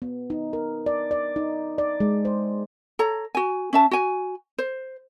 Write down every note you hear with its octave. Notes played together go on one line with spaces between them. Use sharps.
B3
D#4
A#4
D5
D5
D#4
D5
G#3
C5
A4 C#5 A#5
F#4 G#5
C#4 E5 A5
F#4 G#5
C5